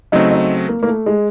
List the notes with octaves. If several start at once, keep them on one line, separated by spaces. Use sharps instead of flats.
C#3 F#3 A3 C4 D#4
D#4
A#3
A#3
A3
G#3